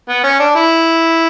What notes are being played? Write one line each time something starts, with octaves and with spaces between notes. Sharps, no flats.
B3
C#4
D4
E4